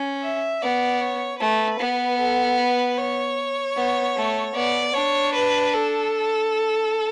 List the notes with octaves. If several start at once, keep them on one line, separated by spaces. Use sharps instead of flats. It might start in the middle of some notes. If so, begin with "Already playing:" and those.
Already playing: C#4
E5
B3 D5
C#5
A3 B4
B3
A4
B4
C#5
B3
A3
B3 D5
D4 C#5
B4
A4